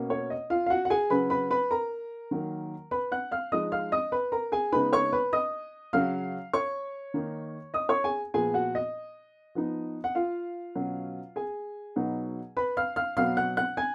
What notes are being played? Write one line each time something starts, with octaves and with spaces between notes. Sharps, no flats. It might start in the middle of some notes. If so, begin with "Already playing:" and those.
Already playing: B2 A#3 C#4
C#5
D#5
F4 F5
F5
F#4 F#5
F#5
G#4 G#5
C#3 F#3 C#4 B4 B5
B4 B5
B4 B5
A#4 A#5
D#3 F#3 A#3
B4 B5
F#5 F#6
F5 F6
F3 G#3 D#4 D#5 D#6
F5 F6
D#5 D#6
B4 B5
A#4 A#5
G#4 G#5
C#3 G#3 B3 D#4 B4 B5
C#5 C#6
B4 B5
D#5 D#6
C#3 F#3 C#4 F5 F6
C#5 C#6
D#3 A#3 D#4
D#5 D#6
C#5 C#6
G#4 G#5
A#2 F3 B3 G#4 G#5
F#4 F#5
D#5
F3 B3 D#4
F#5
F4 F5
B2 F#3 C#4
G#4 G#5
B2 F#3 B3 D#4
B4 B5
F5 F6
F5 F6
B2 F#3 B3 F5 F6
F#5 F#6
F#5 F#6
G#5 G#6